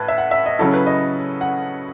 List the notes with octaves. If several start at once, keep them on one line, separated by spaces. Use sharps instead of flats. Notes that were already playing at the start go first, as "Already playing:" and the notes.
Already playing: A2 B4 A5
E5
F#5
E5
D#5
C#3 F#3 C#4 E4 A4
B4
D#5
F#5